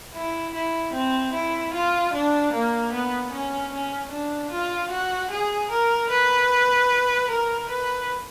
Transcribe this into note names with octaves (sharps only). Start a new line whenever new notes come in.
E4
E4
C4
E4
F4
D4
A#3
B3
C#4
C#4
D4
F4
F#4
G#4
A#4
B4
A#4
B4